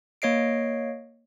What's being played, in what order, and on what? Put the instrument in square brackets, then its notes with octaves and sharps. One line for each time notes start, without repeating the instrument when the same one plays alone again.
[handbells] A#3 C#5 D#5 C7 D7